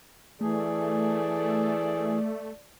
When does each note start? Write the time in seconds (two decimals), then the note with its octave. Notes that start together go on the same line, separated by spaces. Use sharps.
0.41 E3 A3 G#4 A4 D5